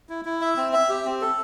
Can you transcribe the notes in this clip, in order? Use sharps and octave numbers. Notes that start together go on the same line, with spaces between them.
E4
E4
E5
C4
E5
G4
C4
A4